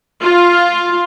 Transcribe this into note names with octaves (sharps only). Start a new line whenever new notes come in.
F4